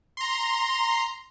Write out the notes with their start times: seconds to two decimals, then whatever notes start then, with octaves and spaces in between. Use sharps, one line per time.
0.17 A#5 C6